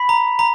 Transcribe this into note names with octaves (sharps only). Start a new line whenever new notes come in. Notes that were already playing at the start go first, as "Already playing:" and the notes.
Already playing: B5 B6
A#5
A#5